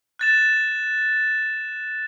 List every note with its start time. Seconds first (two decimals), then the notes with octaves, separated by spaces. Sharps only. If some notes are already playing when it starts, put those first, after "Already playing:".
0.19 F#6 A6 E7